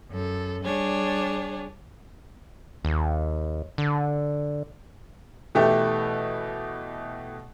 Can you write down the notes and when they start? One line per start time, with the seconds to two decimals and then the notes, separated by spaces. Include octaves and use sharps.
0.10 F#2 A4
0.64 G3 D4 G#4 C#5
2.85 D#2
3.78 D3
5.55 B2 E3 A3 G4